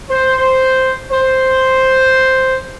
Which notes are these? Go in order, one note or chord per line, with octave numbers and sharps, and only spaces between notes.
C5
C5